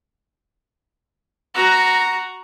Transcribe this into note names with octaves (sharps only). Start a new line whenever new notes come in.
F#4 A#5